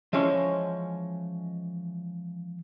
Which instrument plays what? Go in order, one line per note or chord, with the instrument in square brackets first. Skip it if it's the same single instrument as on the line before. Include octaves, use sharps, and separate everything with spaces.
[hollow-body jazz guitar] E3 F3 G#3 C#4 C#5